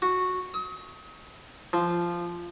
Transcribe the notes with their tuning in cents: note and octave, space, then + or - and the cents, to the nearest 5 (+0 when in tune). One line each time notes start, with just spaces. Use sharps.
F#4 -10
D#6 +40
F3 -10